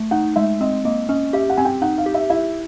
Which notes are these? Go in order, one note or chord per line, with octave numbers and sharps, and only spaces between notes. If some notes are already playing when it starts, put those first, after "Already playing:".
Already playing: A3
D#4 F#5
G#3 E5
C4 D#5
A#3 D#5
C#4 D#5
G4 E5
F#5
C4 G#5
G5
D#4 F#5
F5
G4
E5
E4 E5